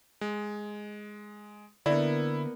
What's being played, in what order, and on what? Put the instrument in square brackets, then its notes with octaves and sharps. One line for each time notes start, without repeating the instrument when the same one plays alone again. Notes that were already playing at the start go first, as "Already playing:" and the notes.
[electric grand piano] G#3
[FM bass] D3 [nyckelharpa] A#3 B3 [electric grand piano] E4 [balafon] D5